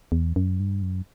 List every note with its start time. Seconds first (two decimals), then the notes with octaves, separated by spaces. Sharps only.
0.12 E2
0.36 F#2
0.60 G2
0.82 F#2